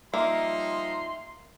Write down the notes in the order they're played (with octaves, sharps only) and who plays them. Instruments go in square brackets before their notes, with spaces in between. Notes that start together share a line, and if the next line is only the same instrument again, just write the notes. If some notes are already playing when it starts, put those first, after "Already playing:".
[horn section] F3 G3 D#4 [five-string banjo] A#3 [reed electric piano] E5 [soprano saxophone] C6